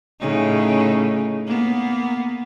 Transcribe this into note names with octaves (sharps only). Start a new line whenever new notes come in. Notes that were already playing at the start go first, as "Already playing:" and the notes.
A2 C#3 D#4
A#3 B3